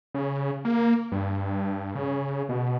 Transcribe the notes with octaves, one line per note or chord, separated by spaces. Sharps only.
C#3
A#3
G2
C#3
B2